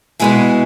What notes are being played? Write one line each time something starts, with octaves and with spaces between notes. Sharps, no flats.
B2 G#3 B3 E4 G#4